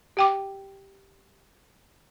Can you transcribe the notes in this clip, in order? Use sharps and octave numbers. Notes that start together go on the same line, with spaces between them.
G4 G5 D6